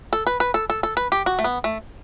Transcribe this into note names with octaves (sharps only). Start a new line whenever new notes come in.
A4
B4
B4
A4
A4
A4
B4
G4
F#4
A3
B3
A3